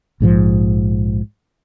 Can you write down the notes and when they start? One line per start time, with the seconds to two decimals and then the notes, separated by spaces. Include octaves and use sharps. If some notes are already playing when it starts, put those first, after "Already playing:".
0.20 A#1 G#2 C#3 F3